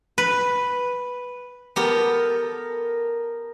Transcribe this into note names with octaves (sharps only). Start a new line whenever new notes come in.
B4
B3 G4 A4 A#4